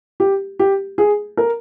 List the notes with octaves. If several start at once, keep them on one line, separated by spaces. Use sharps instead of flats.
G4
G4
G#4
A#4